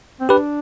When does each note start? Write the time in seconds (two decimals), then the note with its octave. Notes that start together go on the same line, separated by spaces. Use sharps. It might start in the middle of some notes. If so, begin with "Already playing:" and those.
0.21 C4
0.29 D4 G4 B4